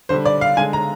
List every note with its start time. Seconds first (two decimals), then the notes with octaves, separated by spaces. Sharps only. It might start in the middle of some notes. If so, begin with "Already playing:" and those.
0.09 D3 G3 C5
0.25 D5
0.41 F5
0.57 D3 G#3 G#5
0.73 A#5